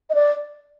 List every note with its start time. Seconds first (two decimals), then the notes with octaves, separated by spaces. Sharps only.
0.10 D#5
0.14 D5